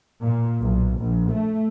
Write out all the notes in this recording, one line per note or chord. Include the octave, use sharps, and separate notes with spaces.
A#2
B1
A#1
A3